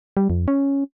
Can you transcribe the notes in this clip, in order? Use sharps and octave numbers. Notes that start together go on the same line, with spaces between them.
G3
F2
C#4